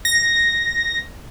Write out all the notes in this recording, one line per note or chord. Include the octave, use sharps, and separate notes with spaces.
A#6